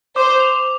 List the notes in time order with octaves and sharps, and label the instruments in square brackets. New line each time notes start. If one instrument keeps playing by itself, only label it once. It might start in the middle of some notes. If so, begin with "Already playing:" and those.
[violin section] C5 [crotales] D6
[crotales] F7